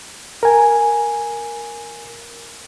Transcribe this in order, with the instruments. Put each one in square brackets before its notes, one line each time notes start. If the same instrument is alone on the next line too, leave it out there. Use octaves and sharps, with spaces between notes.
[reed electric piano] A#4 G#5